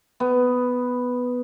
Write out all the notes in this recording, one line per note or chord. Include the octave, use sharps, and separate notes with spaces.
B3